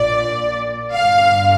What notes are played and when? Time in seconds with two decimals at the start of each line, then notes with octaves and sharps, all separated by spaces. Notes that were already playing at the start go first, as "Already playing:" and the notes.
Already playing: A#1 A#2 D5
0.94 G1 G2 D3 F5